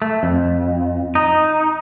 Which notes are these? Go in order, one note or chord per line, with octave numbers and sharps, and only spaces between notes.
A3
F2
D#4